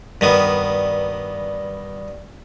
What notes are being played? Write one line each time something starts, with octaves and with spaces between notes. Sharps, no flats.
G2 D#3 B3